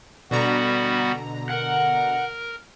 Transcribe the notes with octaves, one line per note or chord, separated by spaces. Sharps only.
B2 D3 G3 B3 F#4 A#5
A#4 F#5